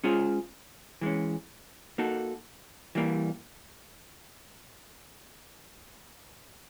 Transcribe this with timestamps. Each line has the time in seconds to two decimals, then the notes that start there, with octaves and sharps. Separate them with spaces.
0.04 G#3 C#4 F4 G#4 C5
1.01 E3 G#3 C#4
1.98 A#3 D#4 F#4 A4
2.95 E3 G3 A#3